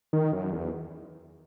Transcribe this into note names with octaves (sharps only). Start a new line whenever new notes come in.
D#3
F#2
E2